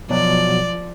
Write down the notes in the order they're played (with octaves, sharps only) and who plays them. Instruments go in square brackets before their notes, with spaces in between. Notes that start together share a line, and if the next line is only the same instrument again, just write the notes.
[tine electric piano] B2 F#3 [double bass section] F3 [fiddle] D5